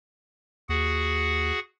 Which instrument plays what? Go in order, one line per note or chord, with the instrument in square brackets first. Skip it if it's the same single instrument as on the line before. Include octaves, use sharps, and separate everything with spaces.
[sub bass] D#2 [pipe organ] F#4 G#4 F#5